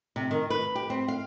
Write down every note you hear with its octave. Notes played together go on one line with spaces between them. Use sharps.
C3
D#3
B4
G4
C4
F5